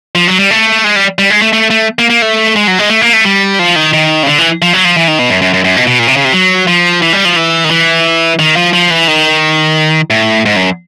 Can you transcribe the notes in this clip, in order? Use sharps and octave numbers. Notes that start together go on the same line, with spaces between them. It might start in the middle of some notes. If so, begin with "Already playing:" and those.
F3
F#3
G3
A3
G#3
G3
G3
G#3
A3
A3
A3
A#3
A#3
A3
G#3
F#3
G#3
A3
A#3
A3
G3
F3
D#3
D#3
C#3
D3
E3
F3
F#3
F3
E3
D#3
B2
F#2
F#2
F#2
F#2
B2
B2
A#2
C3
C#3
C3
F#3
F3
E3
G3
F3
E3
D#3
E3
D#3
F3
F3
E3
D#3
A2
G#2
F#2